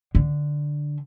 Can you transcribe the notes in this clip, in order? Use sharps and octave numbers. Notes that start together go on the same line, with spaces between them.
D3